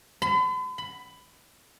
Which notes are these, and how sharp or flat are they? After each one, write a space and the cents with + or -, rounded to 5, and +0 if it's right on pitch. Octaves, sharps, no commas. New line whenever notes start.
B5 +45
B5 +15